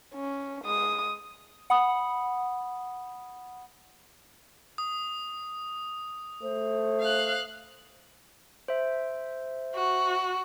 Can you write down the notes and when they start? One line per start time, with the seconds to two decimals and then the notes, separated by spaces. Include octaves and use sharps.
0.14 C#4
0.64 G#3 D#6
1.70 F#5 B5 D#6
4.78 D#6
6.42 A3 C5
7.00 F5 F#6
8.68 C5 E5
9.75 F#4